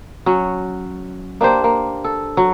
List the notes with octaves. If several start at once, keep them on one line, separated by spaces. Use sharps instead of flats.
F#3 C#4
A#3 D4 G4 C5
A#3
A4
F#3